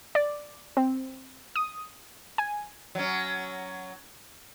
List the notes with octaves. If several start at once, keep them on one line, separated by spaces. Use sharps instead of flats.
D5
C4
D#6
G#5
F#3 C#4